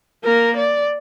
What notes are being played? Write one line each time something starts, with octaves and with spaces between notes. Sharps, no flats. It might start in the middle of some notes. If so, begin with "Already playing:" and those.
A#3 A#4
D5